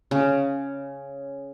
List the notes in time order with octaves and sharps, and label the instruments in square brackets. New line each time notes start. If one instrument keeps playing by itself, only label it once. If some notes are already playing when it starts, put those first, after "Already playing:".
[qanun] C#3